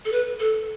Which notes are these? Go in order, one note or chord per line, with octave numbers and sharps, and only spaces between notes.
A4
B4
A4